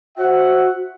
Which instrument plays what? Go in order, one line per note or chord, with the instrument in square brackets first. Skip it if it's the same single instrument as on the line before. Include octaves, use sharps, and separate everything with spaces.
[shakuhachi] F#4 [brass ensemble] C5 E5 F#5